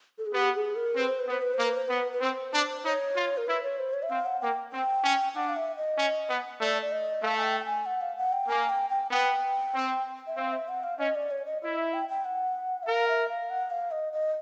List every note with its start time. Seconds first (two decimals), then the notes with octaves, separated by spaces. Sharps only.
0.18 A4
0.26 G#4
0.33 B3 G4
0.55 G#4
0.76 A#4
0.96 C4 B4
1.08 C5
1.19 B4
1.28 B3 C5
1.42 B4
1.54 A#3 C5
1.65 B4
1.76 C5
1.88 B3 B4
2.13 B4
2.21 C4 C5
2.54 D4
2.85 D#4 C#5
3.16 F4
3.37 A#4
3.47 E4 B4
3.63 C#5
3.79 C5
3.94 C#5
4.03 E5
4.10 C4 F5
4.26 F#5
4.41 A#3 G5
4.72 C4 G5
5.04 C#4
5.36 D4 F#5
5.49 F5
5.56 E5
5.77 D#5
5.98 C#4
6.29 B3
6.61 A3 D5
6.82 D5
6.92 D#5
7.23 A3 F5
7.37 G#5
7.44 G5
7.60 G5
7.65 G#5
7.86 F#5
8.01 F5
8.17 F#5
8.33 G5
8.48 A#3 G#5
8.69 G5
8.90 G5
9.11 B3 G5
9.75 C4
10.27 E5
10.37 C4 F5
10.53 E5
10.69 F#5
10.84 F5
10.99 C#4 D#5
11.15 D5
11.31 C#5
11.46 D#5
11.62 E4 D#5
11.78 E5
11.94 G5
12.09 G5
12.25 F#5
12.83 E5
12.87 A#4 F5
13.08 E5
13.29 F5
13.50 F#5
13.71 F5
13.91 D#5
14.13 D#5